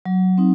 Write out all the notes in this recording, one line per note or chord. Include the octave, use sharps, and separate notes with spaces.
F#3
C4 D#4